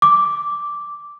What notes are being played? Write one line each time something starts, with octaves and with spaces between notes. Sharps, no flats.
D6